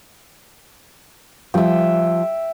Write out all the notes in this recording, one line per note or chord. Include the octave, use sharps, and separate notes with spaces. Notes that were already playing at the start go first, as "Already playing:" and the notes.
F3 G3 F4 E5 G5